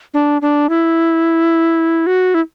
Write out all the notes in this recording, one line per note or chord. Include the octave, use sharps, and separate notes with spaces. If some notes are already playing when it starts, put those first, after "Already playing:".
D4
D4
E4
F#4
E4